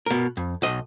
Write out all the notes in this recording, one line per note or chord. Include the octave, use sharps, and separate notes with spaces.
B2 A#4
F2
B1 D#5